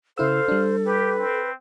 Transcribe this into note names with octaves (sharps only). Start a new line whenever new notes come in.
C#3 E4 A4 C5 F5 E6
G3 D4
G4 B4
C4